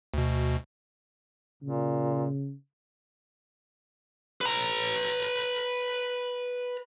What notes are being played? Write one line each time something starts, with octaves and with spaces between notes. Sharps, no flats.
D2 B2
A#2 C#3
B4 A#5